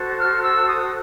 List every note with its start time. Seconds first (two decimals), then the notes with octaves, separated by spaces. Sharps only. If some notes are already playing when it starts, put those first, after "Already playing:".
Already playing: F#4 A4 C5
0.17 F6
0.42 E6
0.68 D#6